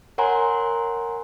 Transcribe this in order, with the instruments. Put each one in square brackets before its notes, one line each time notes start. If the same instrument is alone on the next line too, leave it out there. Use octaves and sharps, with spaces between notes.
[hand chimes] A#4 C#5 F#5 G#5 A#5 C6